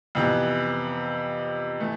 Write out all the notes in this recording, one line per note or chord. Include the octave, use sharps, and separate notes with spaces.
F2 C3 E3 B3
E3 A3